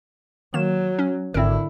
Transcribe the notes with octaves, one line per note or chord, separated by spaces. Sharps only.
D#3 F#3 A#3 E7
C#4
G#1 D3 C4 E4 A#4